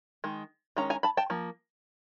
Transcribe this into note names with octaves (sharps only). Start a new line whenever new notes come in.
D#3 G#3
D#3 G#3 C#4 A#5
G#5 A#5
A5 B5
G5 A5
F3 A#3